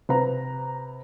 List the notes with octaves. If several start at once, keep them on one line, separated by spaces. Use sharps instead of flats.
C3 B4 A#5